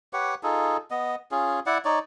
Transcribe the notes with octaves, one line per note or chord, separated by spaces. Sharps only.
G4 B4 C#5 F#5
D#4 F4 G#4 A4
B3 D#5
C#4 F4 G#4
E4 D5 F#5
D#4 C#5 D5